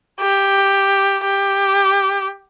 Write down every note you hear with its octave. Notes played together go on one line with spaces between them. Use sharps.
G4
G4